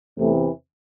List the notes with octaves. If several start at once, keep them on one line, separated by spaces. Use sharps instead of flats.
E2 C3 E3 A3